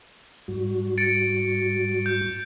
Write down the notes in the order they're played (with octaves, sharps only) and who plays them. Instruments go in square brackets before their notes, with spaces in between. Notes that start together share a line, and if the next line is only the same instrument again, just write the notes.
[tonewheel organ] G#2 G3 F#4
[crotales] A6 C#7 D7
G6